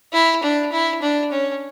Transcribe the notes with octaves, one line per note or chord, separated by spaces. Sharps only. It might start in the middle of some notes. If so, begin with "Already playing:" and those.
E4
D4
E4
D4
C#4